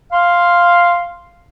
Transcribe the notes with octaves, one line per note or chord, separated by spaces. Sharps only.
F5 C6